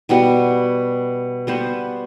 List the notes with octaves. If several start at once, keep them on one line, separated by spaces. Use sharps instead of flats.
B2 G3 B3 F#4
G3 B3 F#4 C5